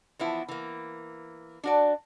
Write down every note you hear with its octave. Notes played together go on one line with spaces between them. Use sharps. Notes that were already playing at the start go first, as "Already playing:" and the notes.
E3 F3 B3 E4
E3 A#3
D4 F#4 D5